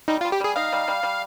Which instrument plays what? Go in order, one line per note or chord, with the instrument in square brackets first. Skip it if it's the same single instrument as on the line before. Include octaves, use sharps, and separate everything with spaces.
[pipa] G3 [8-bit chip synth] D#4
[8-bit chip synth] F4
[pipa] G3
[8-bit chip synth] G4
[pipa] G3 [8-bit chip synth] G#4
[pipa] D#4 [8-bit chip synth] F5
[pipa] G3
G3
G3